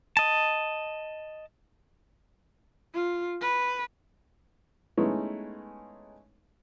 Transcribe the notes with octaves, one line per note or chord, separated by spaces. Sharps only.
D#5 A5
F4
B4
G#3 A3 B3 C#4 D#4 E4